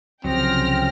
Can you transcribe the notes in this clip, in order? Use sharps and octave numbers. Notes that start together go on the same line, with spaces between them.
C2 C#3 F3 F#3 C4 G5 F6 A#6